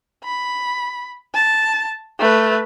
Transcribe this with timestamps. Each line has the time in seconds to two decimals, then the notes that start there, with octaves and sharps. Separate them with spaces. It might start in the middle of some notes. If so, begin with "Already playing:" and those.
0.24 B5
1.34 A5
2.19 A3 B4